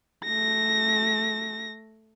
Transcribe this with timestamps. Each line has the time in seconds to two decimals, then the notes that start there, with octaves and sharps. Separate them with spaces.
0.24 A3 A#6